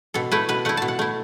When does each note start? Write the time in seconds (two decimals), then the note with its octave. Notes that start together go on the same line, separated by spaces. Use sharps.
0.14 B2 A4
0.31 A3 E4 B4
0.49 B2 B4
0.65 A3 E4 F#5
0.77 B2 A5
0.88 F#5
0.99 A3 E4